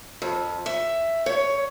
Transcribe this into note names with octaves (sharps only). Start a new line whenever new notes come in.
F2
E5
C#5